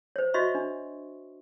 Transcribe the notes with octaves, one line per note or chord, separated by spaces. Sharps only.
C5 C#5
F#4 C#5 D#5 E5 C6 C#6
D4